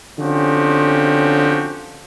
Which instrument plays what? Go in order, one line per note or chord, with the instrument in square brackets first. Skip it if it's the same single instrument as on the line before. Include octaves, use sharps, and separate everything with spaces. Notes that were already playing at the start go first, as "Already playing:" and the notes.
[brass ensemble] D3 F3 C4 C#4 F#4 G4